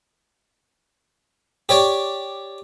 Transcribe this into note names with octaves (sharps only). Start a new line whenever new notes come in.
G4 C#5 D5